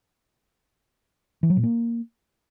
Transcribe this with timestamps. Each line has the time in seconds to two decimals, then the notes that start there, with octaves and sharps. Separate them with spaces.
1.43 E3
1.50 F#3
1.57 A#2
1.63 A#3